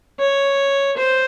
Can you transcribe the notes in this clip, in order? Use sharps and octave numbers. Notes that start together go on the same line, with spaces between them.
C#5
C5